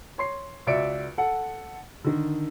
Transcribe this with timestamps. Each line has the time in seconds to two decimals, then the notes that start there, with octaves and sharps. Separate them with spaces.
0.18 C#5 C6 C7
0.67 C#2 F#4 D5 E5 C#7 D7
1.18 A4 F#5
2.04 D3 D#3